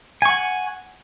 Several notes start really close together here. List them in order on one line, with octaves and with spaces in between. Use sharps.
G#5 C#6 F#5